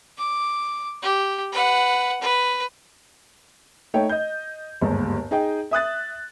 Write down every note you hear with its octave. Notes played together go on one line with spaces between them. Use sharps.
D6
G4
B4 F#5
B4
A3 D#4 C#5 G5
D#5 G6
G1 D#2 G#2
D#4 G#4 D#5 G5
E5 D#6 F#6 A6